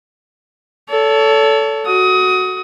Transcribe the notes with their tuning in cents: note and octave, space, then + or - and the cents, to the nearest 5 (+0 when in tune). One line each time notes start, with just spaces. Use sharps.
A4 +0 C#5 +40
F#4 +0 D#6 +25